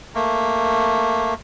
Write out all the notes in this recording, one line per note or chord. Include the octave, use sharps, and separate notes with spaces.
A3 A#3